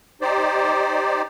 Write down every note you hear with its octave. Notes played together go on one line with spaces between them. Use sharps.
D#4 G4 C5 D5